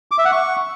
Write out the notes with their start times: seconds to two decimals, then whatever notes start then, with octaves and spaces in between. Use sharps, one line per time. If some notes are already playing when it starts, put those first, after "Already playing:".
0.11 D6
0.18 E5
0.25 F#5
0.32 C#6